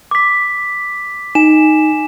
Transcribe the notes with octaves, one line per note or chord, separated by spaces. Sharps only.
D6 B6
D#4 G#5 E7